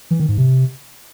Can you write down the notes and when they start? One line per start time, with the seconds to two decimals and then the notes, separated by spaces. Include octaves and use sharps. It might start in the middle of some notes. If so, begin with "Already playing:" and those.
0.11 E3
0.20 D#3
0.29 G#2
0.38 C3